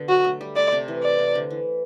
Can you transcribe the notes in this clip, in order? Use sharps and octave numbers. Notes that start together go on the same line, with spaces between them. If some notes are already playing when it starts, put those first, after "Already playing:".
Already playing: B2 D3
F#3 F#4
A3
G3
A3 D5
C3 C4
E3
D5
C3
D3
E3